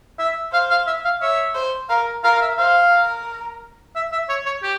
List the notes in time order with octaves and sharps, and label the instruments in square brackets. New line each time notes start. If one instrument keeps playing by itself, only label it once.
[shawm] E5
[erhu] C5 [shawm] F5
[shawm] F5
E5
F5
[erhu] C#5 [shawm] E5
[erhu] C5
[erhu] A#4 [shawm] F5
[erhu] A#4 [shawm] F5
[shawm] F5
E5
[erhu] C5 [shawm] F5
[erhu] A#4
[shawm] E5
E5
C#5
C#5
G4